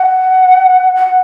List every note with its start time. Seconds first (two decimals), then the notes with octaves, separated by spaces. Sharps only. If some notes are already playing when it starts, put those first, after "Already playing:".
Already playing: F#5
0.96 F#5